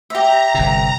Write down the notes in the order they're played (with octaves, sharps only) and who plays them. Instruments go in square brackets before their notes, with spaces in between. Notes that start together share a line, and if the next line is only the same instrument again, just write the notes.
[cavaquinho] G4 E5 [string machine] A#5
[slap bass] G1 C3